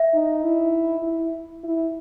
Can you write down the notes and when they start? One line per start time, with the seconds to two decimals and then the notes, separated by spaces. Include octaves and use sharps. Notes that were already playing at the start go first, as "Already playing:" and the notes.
Already playing: E5
0.14 D#4
0.44 E4
1.03 E4
1.64 E4